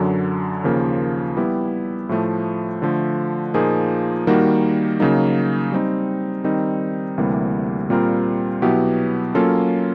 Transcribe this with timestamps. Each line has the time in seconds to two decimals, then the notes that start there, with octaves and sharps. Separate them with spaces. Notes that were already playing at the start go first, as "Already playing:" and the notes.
Already playing: F#2 D3 F#3
0.64 D#2 C#3 F3 A#3
1.37 G3 B3 E4 G4
2.09 A2 F3 A3
2.82 D3 F3 A3
3.54 A#2 F3 A#3 D#4 G#4
4.27 D#3 G3 A#3 D#4 F#4
5.00 C#3 F#3 A#3 D#4
5.72 G3 C4 D#4
6.44 D#3 G3 C4 D#4
7.18 D2 C3 E3 G3 A#3
7.90 A#2 G3 C4 F4 A#4
8.62 B2 F#3 B3 E4 G4
9.35 F#3 A#3 C#4 F4 A4